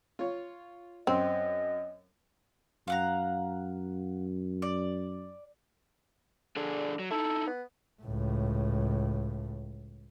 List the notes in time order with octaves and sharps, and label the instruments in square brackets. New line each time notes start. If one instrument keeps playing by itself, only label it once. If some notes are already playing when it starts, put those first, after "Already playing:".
[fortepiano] F4 C#5
[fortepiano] F#2 [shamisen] C4 [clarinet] D#5
[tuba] F#2 [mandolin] F5 F#5 A#5
[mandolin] D5
[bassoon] D3 [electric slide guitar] D4 G#4 D5
[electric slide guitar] F#3
[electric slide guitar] D#4 E4 E5 [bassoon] A4
[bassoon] B3
[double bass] C#2 A2